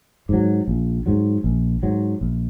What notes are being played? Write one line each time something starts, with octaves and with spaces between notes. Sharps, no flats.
G#2 F#3
A#1
G#2 F#3
A#1
G#2 F#3
A#1